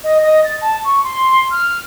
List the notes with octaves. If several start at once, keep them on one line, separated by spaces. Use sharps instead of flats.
D#5
D#5
A6
A5
C#6
C6
F6